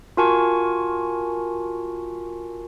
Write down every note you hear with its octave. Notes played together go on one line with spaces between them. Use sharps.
F4 F#4 A#4 G#5 A5 C#6